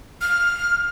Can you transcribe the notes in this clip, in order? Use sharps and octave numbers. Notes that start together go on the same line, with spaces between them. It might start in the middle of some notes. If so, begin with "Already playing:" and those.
F6